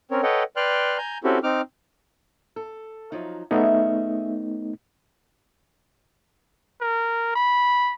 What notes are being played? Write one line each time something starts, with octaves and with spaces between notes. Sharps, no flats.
C4 C#4 A#4 C#5
A4 B4 C#5 D#5 F#5 G5
B4 D5 G5 C6 F6 F#6
G#5 A#5 G6
C4 C#4 E4 F#4 G4 A4
C4 D#4 D6 F6
A4
F3 F#3 D#4
A3 B3 C#4 D#4 G#4 E5
A#4
B5